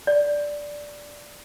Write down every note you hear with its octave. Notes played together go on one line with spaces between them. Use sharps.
D5